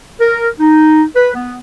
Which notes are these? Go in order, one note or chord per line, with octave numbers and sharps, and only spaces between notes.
A#4
D#4
B4
B3